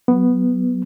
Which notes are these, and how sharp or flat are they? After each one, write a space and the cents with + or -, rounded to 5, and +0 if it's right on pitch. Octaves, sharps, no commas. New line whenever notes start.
F#3 +10 B3 +0